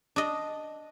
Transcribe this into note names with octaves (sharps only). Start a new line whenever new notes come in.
D4 D#5